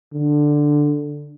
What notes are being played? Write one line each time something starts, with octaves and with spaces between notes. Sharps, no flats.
D3